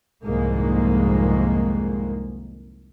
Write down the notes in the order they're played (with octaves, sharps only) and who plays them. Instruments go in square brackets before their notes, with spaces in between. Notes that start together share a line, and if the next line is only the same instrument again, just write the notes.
[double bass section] C2 F2 G#2 D#3 G#3 A#3